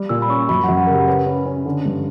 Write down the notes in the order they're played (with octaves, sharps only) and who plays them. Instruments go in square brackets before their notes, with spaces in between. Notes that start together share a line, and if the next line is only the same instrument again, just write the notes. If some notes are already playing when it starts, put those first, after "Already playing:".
Already playing: [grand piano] G3
[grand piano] A#2 [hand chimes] E6
[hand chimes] B5
[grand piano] C#4 [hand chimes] C#6
[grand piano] F#2 [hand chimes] B5
[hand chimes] F#5
[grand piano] F#2
[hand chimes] F#5
[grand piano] C#3 [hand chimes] A#4
[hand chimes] G4
[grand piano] C#4 [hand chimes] B4
[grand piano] C#4
C#4
D3
G2